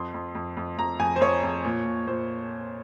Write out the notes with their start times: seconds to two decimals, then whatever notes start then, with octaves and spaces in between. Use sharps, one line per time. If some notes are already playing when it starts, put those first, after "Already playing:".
Already playing: F2 C6
0.14 F2
0.35 F2
0.57 F2
0.78 F2 A#5
0.99 F2 G#5
1.16 C5
1.21 F2 C#5
1.43 F2
1.65 A#2
1.85 A#2
2.08 A#2 C5